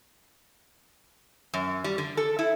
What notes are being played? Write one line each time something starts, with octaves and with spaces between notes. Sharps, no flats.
F#2
G3
D3
A4
E4